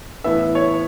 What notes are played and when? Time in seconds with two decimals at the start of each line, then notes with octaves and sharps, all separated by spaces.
0.24 A2 E3 B3 E5
0.55 C#5